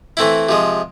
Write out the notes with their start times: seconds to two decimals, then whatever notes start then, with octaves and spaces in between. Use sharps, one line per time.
0.17 E3 A3 C4 E4
0.49 C3 F3 G#3